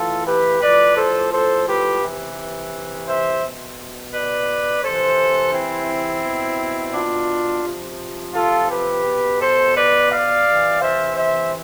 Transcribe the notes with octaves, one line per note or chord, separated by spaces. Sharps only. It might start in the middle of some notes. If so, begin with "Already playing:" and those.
Already playing: A2 E3 F4 A4
G4 B4
A2 F3 B4 D5
A4 C5
A4 C5
G4 B4
C3 E3
C5 E5
B2
B4 D5
C3 E3 A4 C5
C4 E4
B2
D4 F4
C3 F3
F4 A4
G4 B4
B2
A4 C5
B4 D5
D5 F5
C3 E3
C5 E5
C5 E5